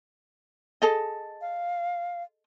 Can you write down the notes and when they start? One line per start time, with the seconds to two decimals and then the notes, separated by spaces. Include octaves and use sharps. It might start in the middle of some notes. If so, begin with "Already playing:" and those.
0.82 G#4 A4 D#5
1.41 F5